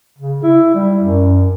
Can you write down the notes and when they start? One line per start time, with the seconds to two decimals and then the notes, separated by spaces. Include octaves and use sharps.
0.18 C#3
0.43 E4
0.74 G3
0.99 F#2